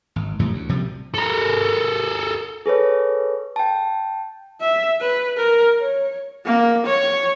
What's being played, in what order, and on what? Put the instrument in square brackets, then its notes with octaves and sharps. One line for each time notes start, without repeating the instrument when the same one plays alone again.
[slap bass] G#1
E2 A2 C#3 G3
D2
A#1 C3 F3 G3
[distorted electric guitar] A4 A#4
[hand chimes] G#4 A4 B4 C#5
G5 A5
[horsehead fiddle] E5
B4
A#4
C#5
A#3
C#5